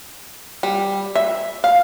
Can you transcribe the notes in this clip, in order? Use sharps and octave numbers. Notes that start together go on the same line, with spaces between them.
G3
E5
F5